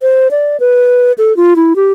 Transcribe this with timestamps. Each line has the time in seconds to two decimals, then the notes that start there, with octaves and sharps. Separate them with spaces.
0.02 C5
0.31 D5
0.60 B4
1.18 A4
1.37 F4
1.56 E4
1.76 G4